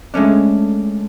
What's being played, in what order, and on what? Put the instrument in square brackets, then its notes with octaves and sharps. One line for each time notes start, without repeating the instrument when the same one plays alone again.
[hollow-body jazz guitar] G#3 A3 C#4 D4